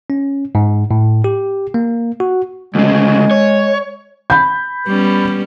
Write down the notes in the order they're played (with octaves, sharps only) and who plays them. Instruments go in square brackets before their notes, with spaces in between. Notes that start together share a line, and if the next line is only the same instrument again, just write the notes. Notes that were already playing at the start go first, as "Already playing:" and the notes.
[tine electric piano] C#4
G#2
A2
G4
A#3
F#4
[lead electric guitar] D2 C#3 [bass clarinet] G#3
[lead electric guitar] C#5
[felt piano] B5 G6
[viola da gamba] G3 B3 C#4